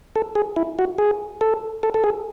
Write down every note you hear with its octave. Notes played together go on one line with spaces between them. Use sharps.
A4
G#4
E4
F#4
G#4
A4
A4
A4
G#4